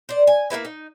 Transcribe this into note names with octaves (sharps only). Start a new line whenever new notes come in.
C5 D5
G#5
A#3 D#4 E4 B4
D#4